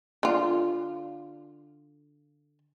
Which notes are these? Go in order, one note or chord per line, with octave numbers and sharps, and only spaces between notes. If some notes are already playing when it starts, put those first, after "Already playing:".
D3 F4